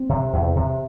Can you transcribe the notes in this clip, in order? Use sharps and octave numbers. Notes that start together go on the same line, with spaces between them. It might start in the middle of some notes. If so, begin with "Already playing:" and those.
Already playing: C4
C3
E2
C3